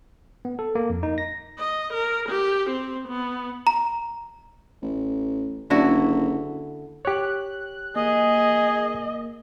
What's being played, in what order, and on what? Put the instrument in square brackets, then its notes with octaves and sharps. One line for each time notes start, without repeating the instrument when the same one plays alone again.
[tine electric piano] B3
A4
A#3
F2
D#4
A#6
[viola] D#5
A#4
G4
C4
B3
[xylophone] A#5
[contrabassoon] A1
[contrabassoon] F#1 [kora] D3 E4 F#4
[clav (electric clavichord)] G4 C#5 [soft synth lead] F#6
[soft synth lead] A#3 [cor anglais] G#4 [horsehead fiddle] D#5